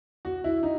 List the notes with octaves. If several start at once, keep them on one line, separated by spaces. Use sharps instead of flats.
F#4
E4
D#4